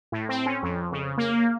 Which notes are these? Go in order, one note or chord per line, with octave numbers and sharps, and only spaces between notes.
A2
C4
C#4
F2
C#3
A#3